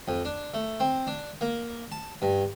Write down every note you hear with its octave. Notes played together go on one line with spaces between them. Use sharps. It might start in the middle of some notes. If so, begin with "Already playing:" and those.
F2
D4
A3
C4
D4
A#3
A5
G2